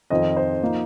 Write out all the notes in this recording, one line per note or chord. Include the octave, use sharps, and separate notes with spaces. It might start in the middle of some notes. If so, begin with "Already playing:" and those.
F2 D#3 C4 F4 D#5
C5
F3 A#3 D#4